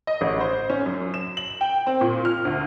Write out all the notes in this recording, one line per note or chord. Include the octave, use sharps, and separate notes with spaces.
D#5
A1
C5
C#4
F#2
E7
F#7
G5
C4
A#2
F6
D2